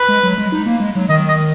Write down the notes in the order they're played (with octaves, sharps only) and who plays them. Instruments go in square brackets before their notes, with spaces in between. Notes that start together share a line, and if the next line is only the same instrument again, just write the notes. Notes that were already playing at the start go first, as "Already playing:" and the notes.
Already playing: [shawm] B4
[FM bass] G#3
F#3
G#3
D#4
A#3
G#3
F#3
[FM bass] D#3 [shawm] D#5
[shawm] D#5